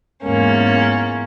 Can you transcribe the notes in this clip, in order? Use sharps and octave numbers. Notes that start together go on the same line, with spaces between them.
E2 G#2 A#3 C#4